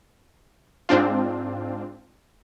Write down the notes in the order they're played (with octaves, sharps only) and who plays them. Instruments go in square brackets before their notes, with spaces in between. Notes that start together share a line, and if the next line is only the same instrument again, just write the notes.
[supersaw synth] G#2 C4 D4 F4